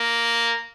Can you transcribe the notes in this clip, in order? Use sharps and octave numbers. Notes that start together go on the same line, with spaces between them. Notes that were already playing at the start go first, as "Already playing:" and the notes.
Already playing: A#3